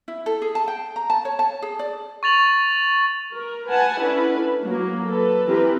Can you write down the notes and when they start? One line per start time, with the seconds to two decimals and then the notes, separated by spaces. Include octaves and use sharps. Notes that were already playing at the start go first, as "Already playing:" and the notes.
0.08 E4
0.26 A4
0.42 G#4
0.55 A5
0.68 G5
0.96 A#5
1.10 A5
1.25 C#5
1.39 A5
1.62 G#4
1.79 D5
2.23 C#6 A6 F7 F#7
3.33 A#4
3.69 B4 F#5 G#5 A5
4.01 C#4 D4 E4 A4 B4
4.64 F#3 A#3
5.07 A4 B4
5.47 E3 C4 G4 A#4 B4